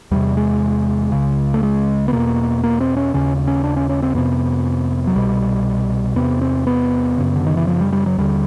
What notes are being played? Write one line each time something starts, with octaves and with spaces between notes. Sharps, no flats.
E2 C3 G3
G#3
C#2 C#3
A3
G#3
B3
E2 B2 A#3
A#3
C4
C#4
D#2 C#3 C#4
C#4
D4
C#4
C#4
C4
F2 C3 B3
F#3
C2 B2 G3
E2 C3 B3
C4
B3
F#2 C#3
D3
D#3
E3
F3
G3
G3
F#3
D#2 D3 G3